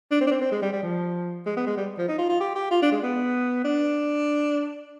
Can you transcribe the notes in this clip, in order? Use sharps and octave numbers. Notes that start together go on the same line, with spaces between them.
D4
C4
D4
C4
C4
G#3
G3
G3
F3
G#3
B3
G#3
G3
F3
D#4
F4
F4
G4
G4
F4
D4
G#3
B3
D4